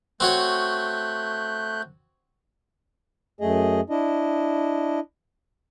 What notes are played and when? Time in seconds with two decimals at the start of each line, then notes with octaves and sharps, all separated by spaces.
0.20 A3 C4 F#4 C#5 F#6 G6
3.41 F#2 A3 G#4 D#5
3.90 D4 E4 D#5